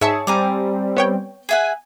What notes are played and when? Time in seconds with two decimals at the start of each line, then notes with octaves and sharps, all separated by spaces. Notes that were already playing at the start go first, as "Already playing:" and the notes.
0.01 G#2 G#4 C#5 E5 A5 C#7
0.27 G3 C4 G#5 A#5 D6
0.97 B3 C#5 G5
1.49 G#4 E5 F#5 G#5